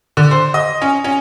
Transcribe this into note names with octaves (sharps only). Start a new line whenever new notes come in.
D3
C5
D#5
C#4
C#4